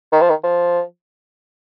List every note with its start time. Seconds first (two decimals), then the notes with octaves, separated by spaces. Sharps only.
0.12 D#3
0.21 F3
0.29 D#3
0.44 F3